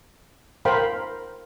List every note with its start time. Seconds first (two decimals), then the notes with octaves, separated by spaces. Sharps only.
0.65 A#4 C5 F5 G5 B5